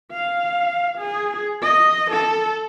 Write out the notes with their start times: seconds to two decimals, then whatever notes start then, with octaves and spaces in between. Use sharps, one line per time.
0.12 F5
0.98 G#4
1.62 D#5
2.11 A4